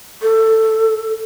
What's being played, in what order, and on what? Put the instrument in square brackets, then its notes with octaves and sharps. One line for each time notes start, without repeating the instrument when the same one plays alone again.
[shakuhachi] A4